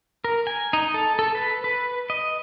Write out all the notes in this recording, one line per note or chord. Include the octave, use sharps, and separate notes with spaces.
A#4
G#5
D#4
A4
A4
B4
B4
D#5